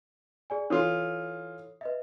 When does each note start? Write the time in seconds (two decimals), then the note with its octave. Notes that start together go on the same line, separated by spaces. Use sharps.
0.50 G#4 D5 G#5
0.70 E3 F4 A4 C#5 D#6
1.81 B4 D#5 E5